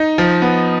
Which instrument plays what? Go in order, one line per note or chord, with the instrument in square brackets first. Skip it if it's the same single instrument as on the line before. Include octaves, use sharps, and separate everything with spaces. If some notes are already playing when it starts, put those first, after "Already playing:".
Already playing: [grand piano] D#4
F3
B3